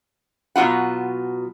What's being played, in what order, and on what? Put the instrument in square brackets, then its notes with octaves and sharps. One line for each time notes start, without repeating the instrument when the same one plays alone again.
[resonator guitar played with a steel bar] B2 F#3 D4 F4 F#5